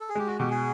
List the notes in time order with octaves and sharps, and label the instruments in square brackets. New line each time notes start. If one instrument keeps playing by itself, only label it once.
[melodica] A4
G#4
[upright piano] G#3 [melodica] G4
[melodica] F#4
[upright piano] B2 [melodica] G4
[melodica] G#4